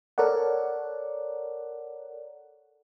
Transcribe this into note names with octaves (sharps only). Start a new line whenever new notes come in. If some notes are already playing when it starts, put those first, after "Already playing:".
A4 A#4 C#5 D5 F#5